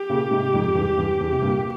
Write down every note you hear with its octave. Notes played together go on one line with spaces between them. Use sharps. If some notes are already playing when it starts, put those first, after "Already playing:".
Already playing: G4
A#2 C#3
G#2 C3
F2 G#2
E2 G2
E2 G2
E2
C3
G2 A#2